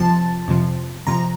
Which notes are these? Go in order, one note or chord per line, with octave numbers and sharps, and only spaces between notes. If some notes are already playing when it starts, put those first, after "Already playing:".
Already playing: F2 C3 F3 A5
F2 C3 F3
F2 C3 F3 A#5